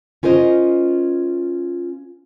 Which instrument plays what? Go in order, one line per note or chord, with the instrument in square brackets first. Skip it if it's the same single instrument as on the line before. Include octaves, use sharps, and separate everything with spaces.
[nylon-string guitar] C#4 F4 A#4 C5 D#5